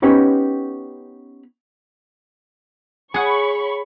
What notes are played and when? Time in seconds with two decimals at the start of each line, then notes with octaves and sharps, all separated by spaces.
0.02 B3 C#4 D#4 G4 B4 C#5
3.14 G#4 C#5 F#5 B5 C#6